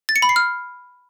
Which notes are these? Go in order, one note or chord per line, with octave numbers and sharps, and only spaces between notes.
A6
C#7
B5
C7
F6